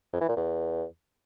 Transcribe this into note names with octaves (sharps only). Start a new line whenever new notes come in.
F2
E3
A#2
E2